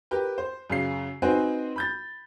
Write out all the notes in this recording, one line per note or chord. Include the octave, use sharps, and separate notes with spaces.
G4 A#4 B4
C5
F#2 C#3 C7
C4 D#4 F#4 B4 C5 G#5
B5 G6 A6